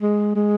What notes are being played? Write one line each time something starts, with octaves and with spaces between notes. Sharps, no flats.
G#3
G#3